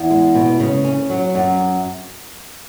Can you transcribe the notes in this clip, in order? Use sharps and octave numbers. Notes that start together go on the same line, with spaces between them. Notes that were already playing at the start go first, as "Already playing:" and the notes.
Already playing: E2
G#3
B2
C#3
C#4
F#3
F#2